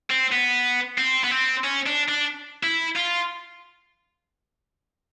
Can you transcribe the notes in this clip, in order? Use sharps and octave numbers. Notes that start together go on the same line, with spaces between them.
C4
B3
C4
B3
C4
C#4
D4
D4
E4
F4